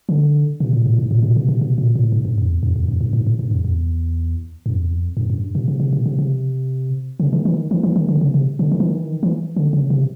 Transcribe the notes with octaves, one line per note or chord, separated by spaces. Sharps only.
D3
B2
A2
A2
G#2
A2
A#2
B2
B2
B2
A#2
A2
G#2
G2
F2
E2
F2
E2
F2
G2
G#2
G#2
G2
F2
E2
F#2
F2
E2
F2
F#2
F#2
G2
B2
C3
C3
B2
C3
C3
C#3
D#3
E3
D#3
E3
E3
D#3
D3
C#3
C3
D3
D#3
E3
D#3
E3
D#3
E3
D3
C#3
C3